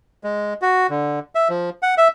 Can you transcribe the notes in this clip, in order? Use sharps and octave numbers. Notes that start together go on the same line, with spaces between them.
G#3
F#4
D3
E5
F3
F#5
E5